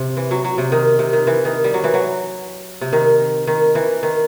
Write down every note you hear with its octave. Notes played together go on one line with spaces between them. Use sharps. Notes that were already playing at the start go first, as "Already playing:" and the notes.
Already playing: C3
E3
F#3
F#3
C3
D#3
C3
D#3
E3
D#3
G3
F#3
E3
F#3
C3
D#3
D#3
E3
D#3